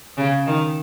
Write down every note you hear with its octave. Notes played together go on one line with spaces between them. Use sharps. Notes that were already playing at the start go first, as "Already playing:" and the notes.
C#3
D#3